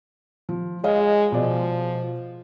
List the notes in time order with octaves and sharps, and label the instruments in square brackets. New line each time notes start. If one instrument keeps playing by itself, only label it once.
[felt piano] F3
[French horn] G#3 [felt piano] C#5 D#5 F5
[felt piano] B2 D5 [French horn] F3